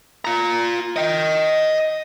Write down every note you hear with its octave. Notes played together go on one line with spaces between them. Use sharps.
F4 A#5
D#5 G5